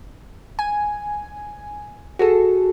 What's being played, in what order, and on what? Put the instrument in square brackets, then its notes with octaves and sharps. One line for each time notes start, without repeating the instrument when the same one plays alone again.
[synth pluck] G#5
F#4 G#4 A4